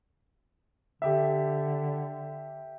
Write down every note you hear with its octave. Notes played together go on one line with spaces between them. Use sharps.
D3 G4 E5